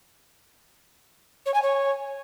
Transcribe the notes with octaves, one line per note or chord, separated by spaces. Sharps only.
C#5
G#5
C#5